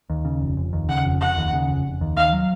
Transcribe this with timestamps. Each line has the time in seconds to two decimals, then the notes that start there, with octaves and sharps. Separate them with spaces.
0.10 D#2
0.25 C#3
0.41 F1
0.57 F1
0.73 D#2
0.89 C#3 F#5
1.05 F1
1.21 F1 F#5
1.37 D#2
1.53 C#3
1.68 F1
1.85 F1
2.01 D#2
2.17 D#3 F5
2.33 F#3